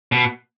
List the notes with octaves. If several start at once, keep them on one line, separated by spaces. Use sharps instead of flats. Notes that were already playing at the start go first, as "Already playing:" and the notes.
B2